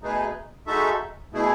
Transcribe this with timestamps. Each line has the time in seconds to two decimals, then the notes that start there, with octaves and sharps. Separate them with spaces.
0.02 B2 A3 D#4 G#4 B4
0.67 G#3 D#4 F#4 A4 E5
1.32 B2 A3 E4 G#4